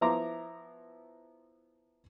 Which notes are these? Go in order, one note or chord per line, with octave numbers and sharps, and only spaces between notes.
F3 B3 E4 A#5 C6 D6